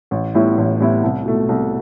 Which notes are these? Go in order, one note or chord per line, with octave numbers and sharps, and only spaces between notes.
A1
A2 G3 B3 E4
A1
A2 G3 B3 E4
C2
B2 A3
C2